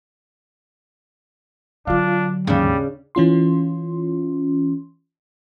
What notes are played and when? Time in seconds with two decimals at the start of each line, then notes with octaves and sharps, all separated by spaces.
1.87 D3 F#3 D4 F4 F5
2.47 D#2 G#2 C#3 G3 D4
3.15 E3 C#4 F4 C6